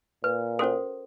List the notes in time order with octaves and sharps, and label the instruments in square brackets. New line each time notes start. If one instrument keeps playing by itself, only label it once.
[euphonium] A#2 [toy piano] B4
[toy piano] C#4 F#4 A4 [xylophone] A#4 C5